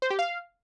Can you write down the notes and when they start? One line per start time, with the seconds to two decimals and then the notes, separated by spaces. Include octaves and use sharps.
0.02 C5
0.10 G4
0.19 F5